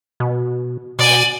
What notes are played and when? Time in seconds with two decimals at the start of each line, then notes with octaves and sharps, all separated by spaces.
0.20 B2
0.99 B2 D5 G#5